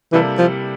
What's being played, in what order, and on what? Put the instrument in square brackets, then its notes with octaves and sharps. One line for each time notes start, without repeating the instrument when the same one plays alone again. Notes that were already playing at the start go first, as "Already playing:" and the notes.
[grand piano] C3 G3 A#3 E4 A4 [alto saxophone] E3
[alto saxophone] F3